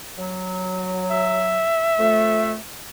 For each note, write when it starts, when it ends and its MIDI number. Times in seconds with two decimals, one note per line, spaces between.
0.17 1.64 54
1.11 2.58 76
1.99 2.56 41
1.99 2.56 57